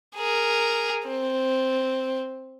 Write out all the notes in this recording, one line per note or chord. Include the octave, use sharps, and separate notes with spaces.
G#4 A#4
C4